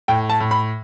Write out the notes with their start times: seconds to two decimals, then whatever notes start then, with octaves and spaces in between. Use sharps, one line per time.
0.08 A2 G5
0.29 A5
0.40 A2
0.51 B5